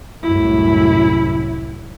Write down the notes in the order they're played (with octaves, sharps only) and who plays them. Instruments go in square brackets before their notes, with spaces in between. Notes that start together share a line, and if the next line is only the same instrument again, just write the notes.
[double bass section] C2 F#2 A2 [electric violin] E4